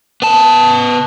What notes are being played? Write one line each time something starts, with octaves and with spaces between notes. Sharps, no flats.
B3 A5